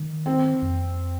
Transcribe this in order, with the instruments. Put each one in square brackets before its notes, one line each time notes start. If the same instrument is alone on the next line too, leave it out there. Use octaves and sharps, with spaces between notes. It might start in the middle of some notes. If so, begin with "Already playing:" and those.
Already playing: [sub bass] D#3
[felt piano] C4
[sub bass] F2